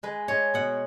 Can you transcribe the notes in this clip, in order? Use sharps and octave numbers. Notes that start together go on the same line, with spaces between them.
G#3 B4
G#3 C#5
B2 F#5